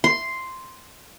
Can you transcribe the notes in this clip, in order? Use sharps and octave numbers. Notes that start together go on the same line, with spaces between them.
C6